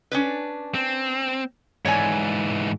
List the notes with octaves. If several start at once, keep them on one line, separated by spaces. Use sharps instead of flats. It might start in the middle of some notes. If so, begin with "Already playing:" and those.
C#4 D4 B4
C4
G#2 E3 C#5 D5 G#5